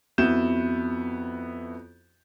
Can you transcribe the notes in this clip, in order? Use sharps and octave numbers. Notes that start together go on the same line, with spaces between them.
F2 B3 E4 F#4 G6 E7